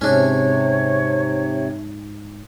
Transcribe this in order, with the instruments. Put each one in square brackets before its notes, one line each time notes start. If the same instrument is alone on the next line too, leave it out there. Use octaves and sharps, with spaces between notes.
[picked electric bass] G#2 [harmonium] C3 [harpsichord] C#4 D4 [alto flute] C#5